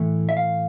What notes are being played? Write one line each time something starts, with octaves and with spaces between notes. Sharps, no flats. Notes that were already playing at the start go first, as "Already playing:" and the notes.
Already playing: A2 E3 A3
E5
F5